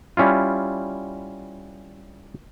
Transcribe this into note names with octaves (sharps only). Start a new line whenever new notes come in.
G3 C#4 E4 F4